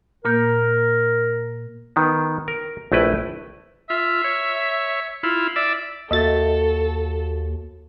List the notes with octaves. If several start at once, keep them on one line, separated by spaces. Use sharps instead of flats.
A#2 A#3 A#4 G6
D#3 B3
A#4
A#1 A3 E4 B4 G5
F4 E5
C#5
E4 F4
D5 E5
D#2 A#3 F#4 A4 D#5 E5 A6